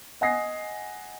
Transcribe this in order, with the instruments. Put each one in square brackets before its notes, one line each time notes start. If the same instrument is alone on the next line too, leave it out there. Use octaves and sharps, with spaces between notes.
[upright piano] D#5 F#5 G#5 D#6 A#6 C7